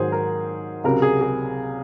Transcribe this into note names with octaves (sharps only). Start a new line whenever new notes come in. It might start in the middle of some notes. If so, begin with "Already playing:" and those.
Already playing: G#2 D#3 F#3 G#4 C5
A#4
C#2 C3 F#3 A#4
G#4
G#4